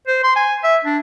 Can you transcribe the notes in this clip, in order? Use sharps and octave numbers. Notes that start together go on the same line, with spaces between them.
C5
C6
G#5
E5
D4